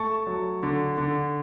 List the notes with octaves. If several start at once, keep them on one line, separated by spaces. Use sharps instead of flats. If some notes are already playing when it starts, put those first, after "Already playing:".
Already playing: A3 A5 C#6
F#3
D3
D3